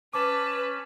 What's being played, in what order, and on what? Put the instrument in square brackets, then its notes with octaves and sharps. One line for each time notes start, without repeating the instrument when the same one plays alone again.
[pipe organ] C#4 [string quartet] B4 [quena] A5 [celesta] D6